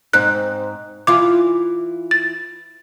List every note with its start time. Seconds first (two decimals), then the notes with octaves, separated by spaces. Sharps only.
0.13 G#2 C4 D#4 F#6
1.07 E3 E4 F4 D6
2.11 A6